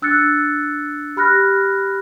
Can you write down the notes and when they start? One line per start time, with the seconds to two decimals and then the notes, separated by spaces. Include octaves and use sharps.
0.02 D4 E6 F#6 A6 C#7
1.17 G4 B5 F6 F#6 A#6